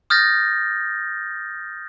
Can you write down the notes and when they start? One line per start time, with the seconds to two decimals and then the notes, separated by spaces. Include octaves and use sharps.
0.10 D#6 F6 G6 A6 A#6